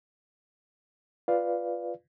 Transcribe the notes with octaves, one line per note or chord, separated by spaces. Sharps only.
F4 B4 D5 F5